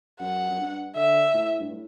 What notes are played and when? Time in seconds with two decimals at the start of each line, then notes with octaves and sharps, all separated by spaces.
0.20 F#2 F#5
0.50 F#2
0.58 G2
0.95 D3 E5
1.34 A2
1.60 G2
1.72 A2